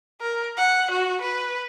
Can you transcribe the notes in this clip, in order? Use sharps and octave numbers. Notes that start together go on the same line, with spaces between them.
A#4
F#5
F#4
B4